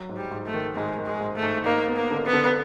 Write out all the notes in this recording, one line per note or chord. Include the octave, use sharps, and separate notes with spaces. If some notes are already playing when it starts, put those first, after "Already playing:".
Already playing: F#3
G#2
G3
G#2
A3
D#3
G#2 G#3
D#3
G#3
G#2
A3
G#2
A#3 D#4
B3
A#3
D3
B3
D3